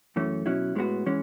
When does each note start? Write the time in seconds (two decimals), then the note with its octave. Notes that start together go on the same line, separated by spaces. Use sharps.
0.16 F#2 E3 A3 C#4
0.46 B2 F#3 C#4 E4
0.75 A2 G#3 B3 F#4
1.06 E3 G#3 C#4